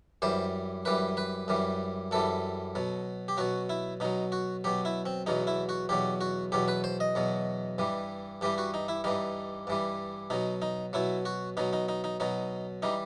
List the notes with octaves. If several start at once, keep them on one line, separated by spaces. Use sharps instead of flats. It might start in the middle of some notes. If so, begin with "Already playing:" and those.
F#2 E3 G3 C5
F#2 E3 G3 B4
B4
F#2 E3 G3
F#2 E3 G3 A4
B2 F#3
G4
B2 F#3 F#4
E4
B2 F#3 D#4
F#4
B2 F#3 G4
E4
C4
E2 B2 F#3 D#4
E4
F#4
E2 B2 F#3 G4
F#4
E2 B2 F#3 G4
B4
C5
D#5
E2 B2 F#3
G2 E3 G3
G2 E3 G3 G4
F#4
D#4
E4
G2 E3 G3 D#4
G2 E3 G3
B2 F#3 D#4
D#4
B2 F#3 E4
F#4
B2 F#3 D#4
D#4
D#4
D#4
B2 F#3 D#4
E3 G3 D#4